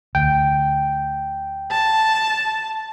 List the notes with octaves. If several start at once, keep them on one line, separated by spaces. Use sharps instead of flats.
D2 G5
A5